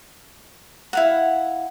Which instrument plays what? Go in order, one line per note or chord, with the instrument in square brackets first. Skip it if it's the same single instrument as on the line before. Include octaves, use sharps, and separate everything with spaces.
[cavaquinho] E4 F5 F#5